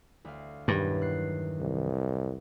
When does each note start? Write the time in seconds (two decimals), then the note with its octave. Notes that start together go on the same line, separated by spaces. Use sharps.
0.25 D2 F5
0.68 B1 E2 G2 D#3
1.02 F#6 C7
1.60 C2